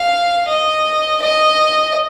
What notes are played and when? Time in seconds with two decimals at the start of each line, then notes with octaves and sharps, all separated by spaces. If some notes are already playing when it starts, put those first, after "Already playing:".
Already playing: F5
0.48 D#5
1.22 D#5